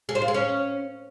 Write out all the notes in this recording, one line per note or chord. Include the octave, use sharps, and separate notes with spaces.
G#4
C5
F4
G#4
C#4